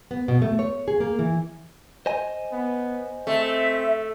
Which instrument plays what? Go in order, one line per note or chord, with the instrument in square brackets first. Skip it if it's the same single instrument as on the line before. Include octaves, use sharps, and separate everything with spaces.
[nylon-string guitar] B3
B2
A3
C#5
G#4
A#3
E3
[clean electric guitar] C5 D#5 G#5
[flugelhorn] B3
[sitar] A3 [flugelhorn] C4 [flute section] E5